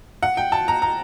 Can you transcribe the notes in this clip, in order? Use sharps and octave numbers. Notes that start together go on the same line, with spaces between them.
F#5
G5
A5
A#5
A#5